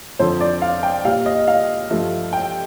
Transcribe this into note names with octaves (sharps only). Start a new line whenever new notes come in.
F2 D3 F3 C5
D5
F5
G5
A#2 G3 F5
D#5
F5
G2 F3 A3
G5